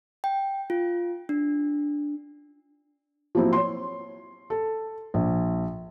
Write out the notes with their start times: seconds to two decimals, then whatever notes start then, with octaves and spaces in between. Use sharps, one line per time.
0.24 G5
0.70 F4
1.29 D4
3.35 F3 F#3 A#3 C4 E4
3.53 C#5 C6
4.50 A4
5.14 A#1